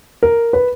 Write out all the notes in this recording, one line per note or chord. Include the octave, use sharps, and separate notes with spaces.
A#4
B4